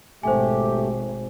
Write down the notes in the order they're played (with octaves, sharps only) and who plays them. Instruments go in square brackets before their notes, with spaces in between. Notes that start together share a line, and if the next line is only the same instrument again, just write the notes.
[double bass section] G#1 B2 [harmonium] A3 G4 [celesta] C5 G#5